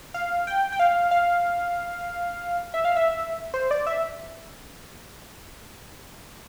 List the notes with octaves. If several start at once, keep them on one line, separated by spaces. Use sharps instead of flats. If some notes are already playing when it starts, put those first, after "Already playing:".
F5
G5
G5
F5
F5
E5
F5
E5
C5
D5
E5